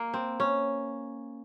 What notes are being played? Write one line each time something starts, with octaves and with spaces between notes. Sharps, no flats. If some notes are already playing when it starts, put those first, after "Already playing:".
Already playing: A#3
C4
C#4